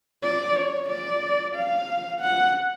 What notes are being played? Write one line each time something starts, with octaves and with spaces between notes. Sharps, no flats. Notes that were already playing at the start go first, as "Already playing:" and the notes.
D5
C#5
D5
F5
F#5